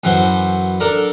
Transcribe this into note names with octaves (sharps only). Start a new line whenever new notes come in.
F#2 E3 F#4 C5
D4 A4 A#4 D5